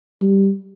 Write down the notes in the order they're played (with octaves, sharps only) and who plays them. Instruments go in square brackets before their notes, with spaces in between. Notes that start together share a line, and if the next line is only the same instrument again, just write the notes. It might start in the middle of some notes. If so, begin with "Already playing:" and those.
[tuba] G3